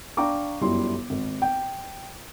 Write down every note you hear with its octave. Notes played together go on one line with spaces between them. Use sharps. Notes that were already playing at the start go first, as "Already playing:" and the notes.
D4 F5 G5 A#5 C#6 D6
G1 F#2 G3 E4 C6
G#1
G5